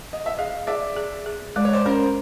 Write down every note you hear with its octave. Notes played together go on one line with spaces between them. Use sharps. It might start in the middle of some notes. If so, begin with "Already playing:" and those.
D#5
E5
G#4 D#5 F5
G#4 D5 E5
G#4
G#4
G#3 D5
C#5
C5 D5
C#4 A#4 C5